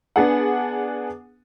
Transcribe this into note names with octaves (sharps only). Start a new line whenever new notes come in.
B3 D4 G#4 F#5